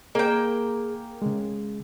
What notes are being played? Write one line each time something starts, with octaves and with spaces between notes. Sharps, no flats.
A#3 G#4 G5
C#3 G#3